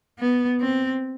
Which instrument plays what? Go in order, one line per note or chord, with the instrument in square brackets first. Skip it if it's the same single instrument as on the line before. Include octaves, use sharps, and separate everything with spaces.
[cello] B3
C4